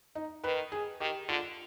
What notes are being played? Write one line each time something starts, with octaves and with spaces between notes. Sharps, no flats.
D#4
D#3 B4
G#4
D#3 G4
D3 F4